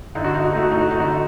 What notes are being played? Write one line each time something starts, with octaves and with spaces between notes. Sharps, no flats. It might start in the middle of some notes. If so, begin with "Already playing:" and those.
D3 D#4
F#4
D#4
F#4
A3 D#4
F#4
D#4
F#4
D#4
D3 F#4
D#4